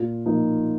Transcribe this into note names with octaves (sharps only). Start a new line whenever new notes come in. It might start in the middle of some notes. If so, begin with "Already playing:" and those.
Already playing: A#2
F3 A#3 D#4